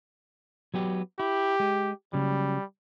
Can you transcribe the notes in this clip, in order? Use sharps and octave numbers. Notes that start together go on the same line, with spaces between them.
F#3 B3 G4
E4 G4
G#3
C#3 F#3 G3